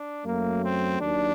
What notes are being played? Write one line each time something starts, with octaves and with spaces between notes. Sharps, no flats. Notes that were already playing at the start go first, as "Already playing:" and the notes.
Already playing: D4
F#2 F#3 A3 A#3
C4
D#2 D#3 F#3 D4